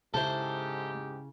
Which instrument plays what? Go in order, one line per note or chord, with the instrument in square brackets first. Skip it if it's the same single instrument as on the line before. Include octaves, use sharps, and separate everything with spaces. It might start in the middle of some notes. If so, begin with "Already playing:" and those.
[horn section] G#2 G4 [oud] C#3 E4 [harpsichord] A4 C5